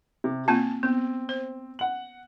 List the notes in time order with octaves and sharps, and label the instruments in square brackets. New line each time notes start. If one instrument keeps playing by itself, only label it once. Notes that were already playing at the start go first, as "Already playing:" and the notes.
[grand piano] C3
[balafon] A#3 C4 F4 [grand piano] G#5 A5
[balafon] B3 [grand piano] C4
[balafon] C5
[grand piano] F#5 F#7